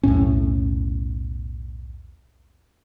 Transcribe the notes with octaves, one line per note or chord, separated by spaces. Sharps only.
B1 E2 A2 C#4